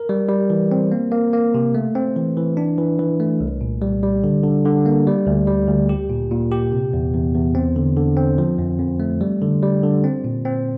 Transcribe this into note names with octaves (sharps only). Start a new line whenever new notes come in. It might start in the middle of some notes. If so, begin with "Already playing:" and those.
Already playing: A#4
G3
G3
E3
C4
A#3
A#3
A#3
C3
A3
C4
E3
E3
D4
E3
E3
A3
C2
A#2
G3
G3
D3
D3
D3
A#3
G3
D2
G3
D2
G4
A#2
A#2
G4
C3
E2
E2
E2
C4
D3
D3
C4
F3
F2
F2
A3
G3
D3
G3
D3
C4
A#2
C4